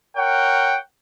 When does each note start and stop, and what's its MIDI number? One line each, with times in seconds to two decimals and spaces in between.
0.16 0.76 70
0.16 0.76 73
0.16 0.76 78
0.16 0.76 79